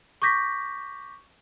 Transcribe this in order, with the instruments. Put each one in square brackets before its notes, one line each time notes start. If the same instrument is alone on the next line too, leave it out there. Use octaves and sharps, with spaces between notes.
[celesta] C#6 D6 G6 A#6 B6